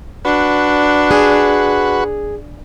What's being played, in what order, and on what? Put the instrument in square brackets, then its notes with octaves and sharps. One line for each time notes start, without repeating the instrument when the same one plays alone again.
[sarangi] D4 [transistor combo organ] F#4 B4
[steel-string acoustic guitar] G#4